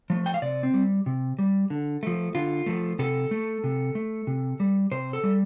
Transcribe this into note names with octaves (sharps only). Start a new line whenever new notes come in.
F3 A3
G5
F5
C3 D5
C4
G3
C3
G3
D3
F3 A3
D3 F4
F3 A3
C3 A4
A3
C3
A3
C3
G3
C3 C5
A4
G3